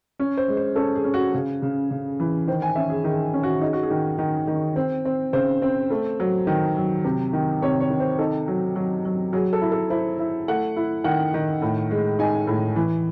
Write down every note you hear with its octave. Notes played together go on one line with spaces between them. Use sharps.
C#4
C5
G#3
C5
C#4 A4
G#4
C#4
F#4
C#3 G#4
C#3
C#3
E3
D#3 C5
G#5
C#4 E5
G#4
D#3 G#4
C#4
F#4
D#4 G#4
F#4
G#4
D#3
D#3
D#3
C4
C4
C#3 C5
C4
A3
F#3
D#3
F#3
C3
D#3
C3 C#5
C#5
D#3
C5
D#4 A4
F#3
F#3
F#3
F#3 G#4
A4
E4
A4
E4 C5
E4
A3 F#5
E4
D#3 F#5
D#3
A2
G#3
D#4 G#5
A2
E3